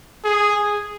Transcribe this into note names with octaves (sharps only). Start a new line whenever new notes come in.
G#4